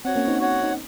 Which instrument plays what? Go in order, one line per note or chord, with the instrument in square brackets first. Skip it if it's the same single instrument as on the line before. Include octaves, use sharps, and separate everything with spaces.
[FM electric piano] C4 [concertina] F#4 C#5 F#5
[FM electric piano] A#3 C#4
C4 D#4
[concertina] F#4 C#5 F#5
[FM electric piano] D#4